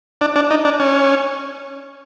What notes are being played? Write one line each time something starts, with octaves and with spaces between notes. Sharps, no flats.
D4
D4
D#4
D4
C#4